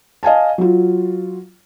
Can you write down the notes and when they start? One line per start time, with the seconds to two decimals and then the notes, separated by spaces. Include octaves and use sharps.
0.23 D#5 F5 G#5 A5
0.58 F#3 F4